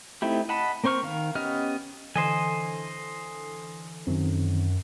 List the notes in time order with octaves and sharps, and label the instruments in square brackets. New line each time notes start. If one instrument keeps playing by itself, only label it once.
[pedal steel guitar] A3 C4 D#4 E4 G4
D#5 F#5 A5 B5
A#3 C4 C5 C#6 F6
D#3 F5
B3 C#4 G4 D#5 F6
[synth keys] D3 E3 A4 [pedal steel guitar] C5 D#5 G#5
[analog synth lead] F#2 [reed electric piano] D#3 C4